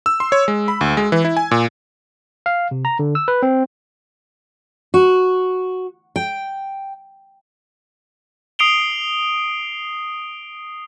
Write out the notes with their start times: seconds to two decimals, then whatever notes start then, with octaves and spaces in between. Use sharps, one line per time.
0.06 E6
0.20 C6
0.32 C#5
0.48 G#3
0.68 B5
0.81 D2
0.97 G#3
1.12 E3
1.25 E4
1.37 G#5
1.51 A#2
2.46 F5
2.71 C3
2.85 A#5
2.99 D3
3.15 E6
3.28 B4
3.43 C4
4.94 F#4
6.16 G5
8.59 D#6 C7 D7 F7 G7